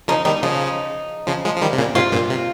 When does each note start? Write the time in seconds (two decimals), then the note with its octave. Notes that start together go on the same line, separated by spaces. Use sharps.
0.08 C#3 F3 D#4
0.25 D#3 G3 D#4
0.43 C#3 F3 D#4
1.27 C#3 F3
1.45 F3 G#3
1.56 F3
1.61 D#3 G3
1.73 C3
1.78 A#2 C#3
1.95 G#2 C3 F4
2.12 G2 A#2
2.30 C3